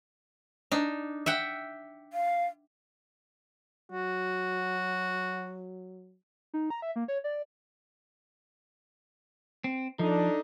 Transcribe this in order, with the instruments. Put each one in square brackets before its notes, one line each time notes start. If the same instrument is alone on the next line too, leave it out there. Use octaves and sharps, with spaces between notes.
[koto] D4 D#4
E5 F#5 G5
[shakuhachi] F5
[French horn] F#3 [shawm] F#4
[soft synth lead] D#4
A#5
E5
A#3
C#5
D5
[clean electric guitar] C4
[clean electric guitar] F3 [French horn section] D4 D#4 A4